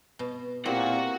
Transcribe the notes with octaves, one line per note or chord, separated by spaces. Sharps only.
B2
A#2 C4 E4 F#4 G4 F#5